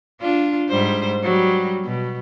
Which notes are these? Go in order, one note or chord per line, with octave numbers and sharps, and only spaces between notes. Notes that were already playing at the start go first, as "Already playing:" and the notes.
D4 F4
G#2 G3 C5
F#3 G3
B2